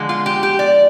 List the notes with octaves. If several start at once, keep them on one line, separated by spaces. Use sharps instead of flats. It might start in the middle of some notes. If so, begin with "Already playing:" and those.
Already playing: D3 F3 G#3
F4
G4
G4
D5